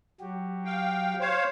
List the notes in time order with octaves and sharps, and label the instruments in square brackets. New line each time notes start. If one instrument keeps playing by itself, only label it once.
[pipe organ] F#3 F#4 G4
[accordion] F5 G5
C5 C#5 F5